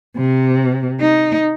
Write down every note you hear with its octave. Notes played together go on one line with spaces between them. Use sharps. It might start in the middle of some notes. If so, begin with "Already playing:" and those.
C3
D#4